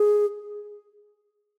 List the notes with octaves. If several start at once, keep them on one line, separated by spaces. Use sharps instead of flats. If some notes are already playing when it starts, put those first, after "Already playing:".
Already playing: G#4